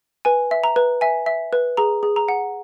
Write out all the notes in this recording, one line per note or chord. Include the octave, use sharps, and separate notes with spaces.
B4 G#5
E5
A#5
B4
E5 G#5
E5
B4
G#4 A#5
G#4
A#5
F#5